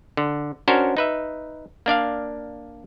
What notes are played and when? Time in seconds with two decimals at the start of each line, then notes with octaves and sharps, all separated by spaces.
0.17 D3
0.68 C#4 D4 F#4 A#4 C5 C#5
0.97 D#4 B4 E5
1.86 A#3 D4 D5 F5